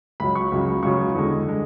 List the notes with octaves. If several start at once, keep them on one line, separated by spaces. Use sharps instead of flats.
C#2 C#3 F#3 B5
C#6
C#2 C#3 F#3
C#2 C#3 F#3 C#6
E2 D3 G#3
D3 G#3